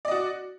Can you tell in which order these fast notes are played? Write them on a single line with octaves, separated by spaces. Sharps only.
D5 D#5 F#4